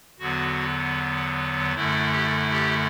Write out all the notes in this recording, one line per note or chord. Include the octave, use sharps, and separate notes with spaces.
E2 D3 F#3 B3 F#4
F#2 D3 A3 E4
G4
G4